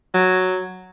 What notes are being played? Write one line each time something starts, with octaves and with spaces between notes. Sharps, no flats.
F#3